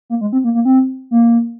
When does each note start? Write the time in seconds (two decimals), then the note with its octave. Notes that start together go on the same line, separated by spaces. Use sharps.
0.10 A#3
0.21 G#3
0.33 C4
0.44 A#3
0.55 A#3
0.65 C4
1.11 A#3